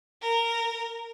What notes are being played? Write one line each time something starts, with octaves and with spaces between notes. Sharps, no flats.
A#4